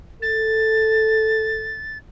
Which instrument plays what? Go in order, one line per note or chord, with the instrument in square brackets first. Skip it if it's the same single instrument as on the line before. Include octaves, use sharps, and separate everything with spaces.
[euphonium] A4 [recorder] A6